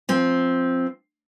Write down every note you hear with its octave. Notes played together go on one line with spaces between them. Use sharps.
F3 C4